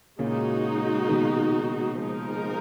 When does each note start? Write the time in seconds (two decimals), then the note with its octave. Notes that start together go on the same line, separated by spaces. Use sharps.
0.19 A#2 C#3 G#3 D#4 F#4
1.09 B2 D#3
2.00 F3 G#3 D#4 A#4